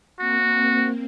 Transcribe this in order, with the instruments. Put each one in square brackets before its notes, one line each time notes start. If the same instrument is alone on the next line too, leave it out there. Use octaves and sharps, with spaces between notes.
[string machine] A#3 C4 [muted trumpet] F#4